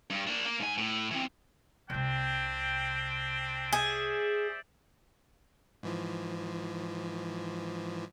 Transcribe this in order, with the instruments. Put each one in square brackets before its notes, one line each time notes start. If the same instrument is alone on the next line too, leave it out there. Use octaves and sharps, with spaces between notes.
[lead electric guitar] G2
A#3 D4
A#3
G#2 G#5
A2
E3 C4
[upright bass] C2 C3 [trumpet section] C4 D4 G5
[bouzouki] G#4 [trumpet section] C5 D5 E5
[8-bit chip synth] G#2 E3 F3